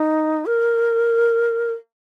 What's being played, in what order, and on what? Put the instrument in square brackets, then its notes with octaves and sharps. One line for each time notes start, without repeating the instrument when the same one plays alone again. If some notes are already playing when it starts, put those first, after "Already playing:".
Already playing: [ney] D#4
A#4